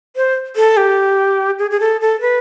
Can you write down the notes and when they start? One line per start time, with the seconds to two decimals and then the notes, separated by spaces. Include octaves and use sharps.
0.16 C5
0.56 A4
0.77 G4
1.59 G#4
1.71 G#4
1.80 A4
2.01 A4
2.21 B4